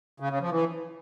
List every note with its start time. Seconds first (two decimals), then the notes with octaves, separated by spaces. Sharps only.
0.20 C#3
0.30 C#3
0.40 F3
0.51 E3